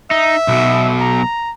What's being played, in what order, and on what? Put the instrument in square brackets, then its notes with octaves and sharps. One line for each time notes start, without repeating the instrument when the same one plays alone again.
[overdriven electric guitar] D#4 [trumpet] E5
[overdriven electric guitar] B1 B2
[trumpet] A#5